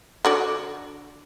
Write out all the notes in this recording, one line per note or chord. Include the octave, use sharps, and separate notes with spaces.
D3 F#4 D5